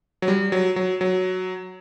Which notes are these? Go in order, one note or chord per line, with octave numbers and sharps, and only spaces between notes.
F#3
G3
F#3
F#3
F#3